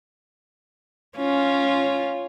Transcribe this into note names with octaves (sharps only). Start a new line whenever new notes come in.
C#4 F4